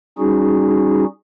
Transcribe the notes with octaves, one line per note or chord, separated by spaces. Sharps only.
G3 C#4 D#4 F#4 G#4